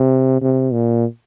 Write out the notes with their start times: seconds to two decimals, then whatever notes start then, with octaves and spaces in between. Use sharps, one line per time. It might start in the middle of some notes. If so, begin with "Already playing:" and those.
Already playing: C3
0.41 C3
0.72 A#2